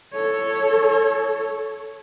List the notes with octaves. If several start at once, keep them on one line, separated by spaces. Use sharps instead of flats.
A4 C#5